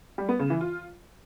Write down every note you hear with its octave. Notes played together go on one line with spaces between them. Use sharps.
G3
B3
C#3
E3
F4